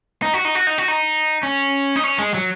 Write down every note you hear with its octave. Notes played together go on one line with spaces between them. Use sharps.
D#4
F#4
D#4
F#4
D#4
F#4
D#4
C#4
D#4
C#4
G#3
F#3